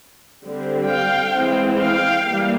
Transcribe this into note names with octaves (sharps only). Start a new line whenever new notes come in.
D3 G3 C4
F5 G5
E3 G#3 C4
F5 G5
E3 G3 A#3